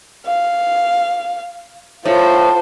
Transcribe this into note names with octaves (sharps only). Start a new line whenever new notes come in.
F5
A2 F4 C5